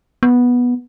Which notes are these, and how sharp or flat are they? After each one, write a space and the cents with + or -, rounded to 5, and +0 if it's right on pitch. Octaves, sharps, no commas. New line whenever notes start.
B3 -10